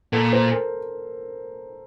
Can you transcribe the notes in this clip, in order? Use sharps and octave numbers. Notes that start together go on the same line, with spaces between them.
A#2 A4
C5
A#4